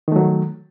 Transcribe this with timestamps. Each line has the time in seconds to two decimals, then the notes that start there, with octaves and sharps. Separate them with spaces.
0.08 D#3
0.12 A3
0.16 F#3